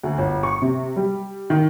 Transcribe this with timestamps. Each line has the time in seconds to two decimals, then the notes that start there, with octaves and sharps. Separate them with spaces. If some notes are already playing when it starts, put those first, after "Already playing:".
0.03 D2
0.18 G1
0.43 C#6
0.62 C3
0.96 G3
1.50 D#3